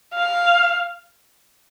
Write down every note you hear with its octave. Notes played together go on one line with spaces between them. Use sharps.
F5